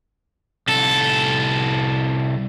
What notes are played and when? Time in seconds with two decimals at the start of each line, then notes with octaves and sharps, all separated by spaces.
0.68 C2 A4